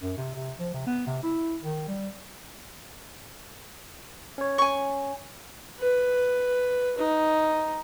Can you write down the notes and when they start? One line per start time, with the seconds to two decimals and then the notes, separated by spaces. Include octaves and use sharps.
0.01 F#2
0.17 C3
0.35 C3
0.60 F3
0.74 C3
0.87 B3
1.07 C3
1.23 E4
1.63 D#3
1.88 G3
4.38 C#4 C#5
4.58 G#5 C#6
5.79 B4
6.98 D#4